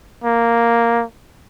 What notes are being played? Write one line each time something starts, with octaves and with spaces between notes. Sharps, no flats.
A#3